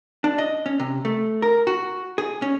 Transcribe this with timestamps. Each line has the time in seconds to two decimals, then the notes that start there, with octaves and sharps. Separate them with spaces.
0.24 D4
0.38 D#5
0.66 C#4
0.80 C3
1.05 A3
1.42 A#4
1.67 F#4
2.18 G#4
2.42 C#4